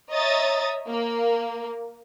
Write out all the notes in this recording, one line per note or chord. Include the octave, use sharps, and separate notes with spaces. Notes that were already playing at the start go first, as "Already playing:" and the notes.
C#5 D#5 E5 A#5 D#6 A6
A#3